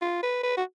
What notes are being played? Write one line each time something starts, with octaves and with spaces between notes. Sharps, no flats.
F4
B4
B4
F#4